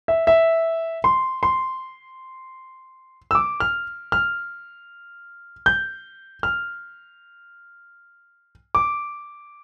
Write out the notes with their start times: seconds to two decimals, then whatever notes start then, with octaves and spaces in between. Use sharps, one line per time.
0.08 E5
0.27 E5
1.04 C6
1.43 C6
3.31 E6
3.35 D6
3.60 F6
4.12 F6
5.66 G6
6.43 F6
8.75 D6